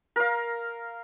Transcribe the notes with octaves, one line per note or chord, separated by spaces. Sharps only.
A#4 F5